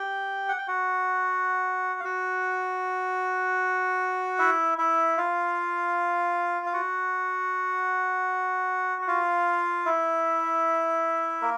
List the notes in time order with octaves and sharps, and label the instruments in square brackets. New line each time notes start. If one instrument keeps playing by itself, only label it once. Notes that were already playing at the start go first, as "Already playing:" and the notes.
Already playing: [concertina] G4 G5
F#5
G5
F#4 F#5
F5
F#4 F#5
E4 E5
E4 E5
F4 F5
F5
F#4 F#5
F#5
F4 F5
E4 E5
A#3 A#4